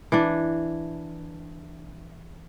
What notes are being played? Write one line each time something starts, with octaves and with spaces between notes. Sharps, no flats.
E3 D4